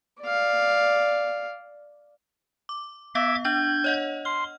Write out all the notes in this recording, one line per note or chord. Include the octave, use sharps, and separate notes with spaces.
D5 F5
D6
B3 E5 F5 D6 G#6
D4 G6 G#6 F#7
C#5 D#5 F#5
C6 F6